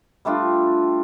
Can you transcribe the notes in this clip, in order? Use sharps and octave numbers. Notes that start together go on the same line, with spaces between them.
G3 A3 D4 F4